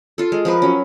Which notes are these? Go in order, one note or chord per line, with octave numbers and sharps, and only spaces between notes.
F4 A4
G#3
F3 A#4 B4
F#3 C#4